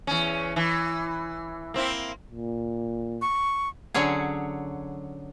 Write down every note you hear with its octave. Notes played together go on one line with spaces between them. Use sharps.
E2 C#4
E3
A#3 C4 E4
A#2
C#6
D3 F#3 C#4 G#4